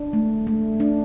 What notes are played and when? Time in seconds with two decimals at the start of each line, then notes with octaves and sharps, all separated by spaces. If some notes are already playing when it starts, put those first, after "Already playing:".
Already playing: D4
0.13 A3
0.47 A3
0.80 D4